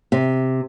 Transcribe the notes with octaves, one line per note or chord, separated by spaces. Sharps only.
C3